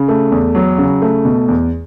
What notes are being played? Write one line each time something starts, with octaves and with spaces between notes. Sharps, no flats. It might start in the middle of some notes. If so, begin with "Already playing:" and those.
Already playing: C#3
A3
E2
F#3
C#3
A3
B2
E2